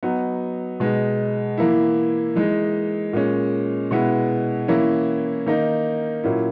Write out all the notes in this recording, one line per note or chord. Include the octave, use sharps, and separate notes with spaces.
F#3 B3 D#4
B2 G#3 D#4
E3 A#3 E4
E3 G#3 D#4
A#2 G#3 C#4
B2 G#3 B3 E4
E3 A#3 C#4 E4
D#3 A#3 D#4
A#2 F#3 C#4 E4